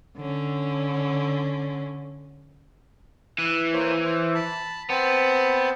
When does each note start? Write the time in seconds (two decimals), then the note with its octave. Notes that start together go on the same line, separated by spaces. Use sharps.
0.16 D3 C#4
3.39 E3 F#6
3.73 A#3 C5 C#5
4.04 C5
4.35 A5 B5
4.90 B3 C4 C5 A5